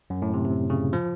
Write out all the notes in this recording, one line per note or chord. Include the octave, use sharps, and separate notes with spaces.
F#2
A2
C3
C3
C#3
F3